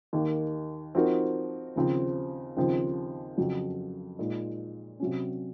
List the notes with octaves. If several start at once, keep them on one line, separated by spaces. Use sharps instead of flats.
D#2 D#3 A#3
F3 C4 D#4 F#4 A#4
D#2 C#3 F3 C4
D#2 C#3 F3 C4
F2 C#3 F#3
A#2 G#3 D#4
C3 F#3 C#4